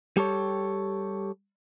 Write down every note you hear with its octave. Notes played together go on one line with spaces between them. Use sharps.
G3 G4 A4 C#5